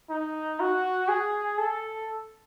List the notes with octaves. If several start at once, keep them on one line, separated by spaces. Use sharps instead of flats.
D#4
F#4
G#4
A4